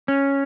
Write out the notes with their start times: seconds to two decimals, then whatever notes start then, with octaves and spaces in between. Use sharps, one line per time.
0.08 C#4